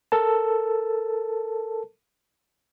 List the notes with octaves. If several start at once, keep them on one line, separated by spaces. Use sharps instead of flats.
A4 A#4 A5